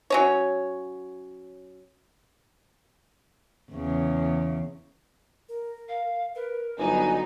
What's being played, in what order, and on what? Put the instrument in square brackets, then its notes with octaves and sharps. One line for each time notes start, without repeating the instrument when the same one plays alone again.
[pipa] F#3 C#4 C#5
[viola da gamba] E2 C#3
[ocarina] A#4
[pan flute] F5
[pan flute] A#4 [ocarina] B4
[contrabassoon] G1 [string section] F#3 B3 D#4 [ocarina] F#4 [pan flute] G#5